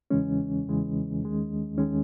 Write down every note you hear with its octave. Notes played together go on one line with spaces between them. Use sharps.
E2 C#3 E3 G#3 C#4
E2 C#3 E3 G#3
D#2 D#3 G#3
D#2 D#3 G#3 C#4